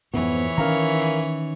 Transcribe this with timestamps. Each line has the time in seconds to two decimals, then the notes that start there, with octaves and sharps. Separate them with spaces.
0.14 F2 G#2 E3 B3 C#5
0.58 D#3 C#4 A#4 F5 A#5